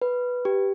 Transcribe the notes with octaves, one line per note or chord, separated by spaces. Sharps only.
B4
G4